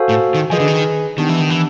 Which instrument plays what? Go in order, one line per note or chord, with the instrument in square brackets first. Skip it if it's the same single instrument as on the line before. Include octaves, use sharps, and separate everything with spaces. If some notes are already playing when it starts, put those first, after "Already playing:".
Already playing: [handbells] F#4 A4 C5 F5 G#5
[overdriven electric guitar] A2
D#3
[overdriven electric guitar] F3 [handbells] G#4 B4 D#5 G#5
[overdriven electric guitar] D3
D#3
[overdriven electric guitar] D#3 [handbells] B3 D4 G4
[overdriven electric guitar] E3
D#3
E3